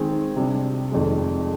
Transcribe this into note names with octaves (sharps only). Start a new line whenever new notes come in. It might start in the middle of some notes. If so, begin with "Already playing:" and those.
Already playing: D#3 G#3 C4 D#4 G#4
C3 G3 D4
F1 F2 D#3 G#3